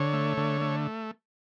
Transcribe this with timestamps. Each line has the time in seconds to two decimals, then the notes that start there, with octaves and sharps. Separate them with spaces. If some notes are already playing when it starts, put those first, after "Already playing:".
Already playing: D3 C#5
0.13 A3
0.37 D3
0.61 A3